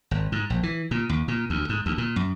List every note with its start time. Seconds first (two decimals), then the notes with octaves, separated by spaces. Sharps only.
0.11 G#1
0.32 G#2
0.50 A#1
0.63 E3
0.91 A#2
1.09 D#2
1.28 A#2
1.50 D2
1.69 G#2
1.86 D2
1.98 A#2
2.16 F#2